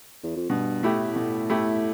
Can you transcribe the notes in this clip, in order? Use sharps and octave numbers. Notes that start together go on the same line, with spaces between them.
E2
F2
G2 B2
A2 A3 E4 G4
B2
A3 E4 G4